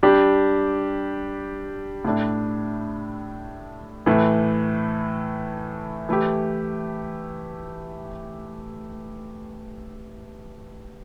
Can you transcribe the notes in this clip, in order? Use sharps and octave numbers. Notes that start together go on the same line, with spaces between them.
G3 D4 G4
A2 A3 D4
A2 E3 A3
E3 A3 E4 G4